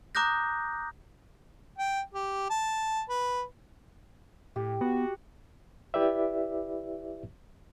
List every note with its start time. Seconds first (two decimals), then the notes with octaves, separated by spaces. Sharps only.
0.15 A#5 D6 D#6 F#6 G6 A#6
1.78 G5
2.15 G4
2.50 A5
3.09 B4
4.56 A2 G4
4.81 B3 F#4
5.94 E4 G4 B4 D5 E5